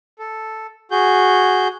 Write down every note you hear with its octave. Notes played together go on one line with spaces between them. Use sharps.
A4
F#4 G#4 G6